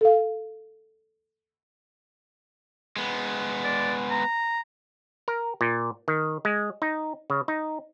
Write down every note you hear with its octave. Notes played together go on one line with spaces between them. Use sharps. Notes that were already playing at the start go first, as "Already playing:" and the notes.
A4 F5
G#3 B3
D5
A#5
A#4
A#2
D#3
G#3
D#4
C#3
D#4